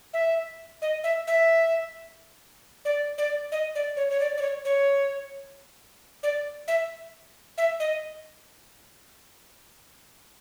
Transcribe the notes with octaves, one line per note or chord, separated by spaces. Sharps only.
E5
D#5
E5
E5
D5
D5
D#5
D5
C#5
C#5
D5
D5
C#5
C#5
D5
E5
E5
D#5